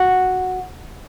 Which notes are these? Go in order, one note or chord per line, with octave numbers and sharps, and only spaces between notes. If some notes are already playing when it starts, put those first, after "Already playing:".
Already playing: F#4